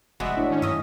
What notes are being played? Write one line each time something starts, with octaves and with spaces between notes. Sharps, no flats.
F1 G#3 B3 F#4 B4 D5 E5
A2 D4
D#3 C#4
G2 A#4 D#5 E5